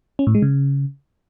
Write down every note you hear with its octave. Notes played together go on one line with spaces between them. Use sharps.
C#4
A2
G#3
C#3